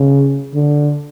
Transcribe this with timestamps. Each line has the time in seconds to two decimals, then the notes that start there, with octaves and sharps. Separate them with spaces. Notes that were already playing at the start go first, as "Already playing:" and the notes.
Already playing: C#3
0.54 D3